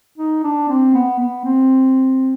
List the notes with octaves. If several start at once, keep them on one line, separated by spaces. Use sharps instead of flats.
D#4
D4
C4
B3
B3
C4